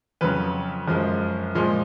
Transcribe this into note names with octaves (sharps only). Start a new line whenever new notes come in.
F2 C#3 F#3 B4
F#2 F3 G#3
A#2 F3 G#3